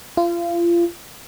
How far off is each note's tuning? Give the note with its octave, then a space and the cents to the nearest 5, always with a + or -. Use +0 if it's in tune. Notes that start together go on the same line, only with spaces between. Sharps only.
F4 -30